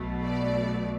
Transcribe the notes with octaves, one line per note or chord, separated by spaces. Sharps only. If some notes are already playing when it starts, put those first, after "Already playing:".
Already playing: B1 B2 A3
D5